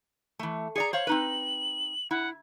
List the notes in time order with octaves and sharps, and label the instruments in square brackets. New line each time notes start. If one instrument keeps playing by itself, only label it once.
[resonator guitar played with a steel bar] E3 A3
[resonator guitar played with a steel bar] G#4 D5 A#5 [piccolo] C#7
[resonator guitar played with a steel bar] C5 C#5 F5 [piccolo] F#7
[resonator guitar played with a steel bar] C4 D#4 B4
[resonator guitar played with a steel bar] E4 [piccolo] F#5